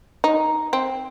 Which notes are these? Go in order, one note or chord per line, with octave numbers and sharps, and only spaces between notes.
D#4
C4